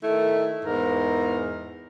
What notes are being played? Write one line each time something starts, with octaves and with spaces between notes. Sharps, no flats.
D#3 A3 E4
E2 G#2 A#4